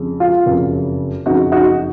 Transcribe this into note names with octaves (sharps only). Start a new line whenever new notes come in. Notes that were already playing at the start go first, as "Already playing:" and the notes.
Already playing: F2 C#3 G#3
F4
F#1 F2 C#3
F#1 F2 C#3 D#4 F#4
D#4 F#4